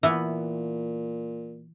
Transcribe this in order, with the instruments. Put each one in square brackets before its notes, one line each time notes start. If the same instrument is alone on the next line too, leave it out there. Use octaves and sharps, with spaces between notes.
[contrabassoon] A#2 [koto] E3 B3 B4